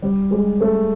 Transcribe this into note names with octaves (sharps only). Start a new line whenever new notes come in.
G3
G#3
A3